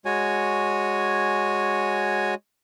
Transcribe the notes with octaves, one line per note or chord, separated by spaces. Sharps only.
G#3 F#4 C#5 G#5